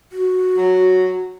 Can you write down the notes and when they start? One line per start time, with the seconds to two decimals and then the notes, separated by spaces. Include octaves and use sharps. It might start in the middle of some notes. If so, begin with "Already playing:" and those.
0.12 F#4
0.57 F#3